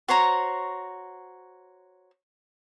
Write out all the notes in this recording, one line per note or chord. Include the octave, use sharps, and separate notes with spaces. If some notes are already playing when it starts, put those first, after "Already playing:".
F#4 C5 C#5 A#5